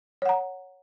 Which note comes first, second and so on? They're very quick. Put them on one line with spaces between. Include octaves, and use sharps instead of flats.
C#5 F#5 A#5